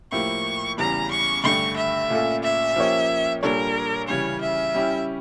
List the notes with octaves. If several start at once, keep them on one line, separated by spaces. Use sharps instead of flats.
A2 F3 A#3 E4 G4 C#6
E2 C#3 E3 G3 A#5
C#6
G2 D3 A3 D4 G4 C#6
E5
A#2 A3 C#4 F4 A4
E5
F3 A#3 C#4 G4 C#5
A#2 G3 D4 A4 A#4 C#5
C#3 E3 G3 C#4 C#5
E5
G3 C#4 E4 G4